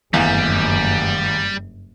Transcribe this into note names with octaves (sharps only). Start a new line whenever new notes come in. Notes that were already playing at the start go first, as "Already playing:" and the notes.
F#1 E2 G2 D#3 G3 A3 F5 G#5